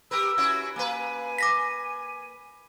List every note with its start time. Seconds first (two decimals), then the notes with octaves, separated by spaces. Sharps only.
0.11 G4 A#4 B4 E6
0.38 C#4 E4 F#4
0.76 A#3 B4 G#5
1.38 D6 A#6 B6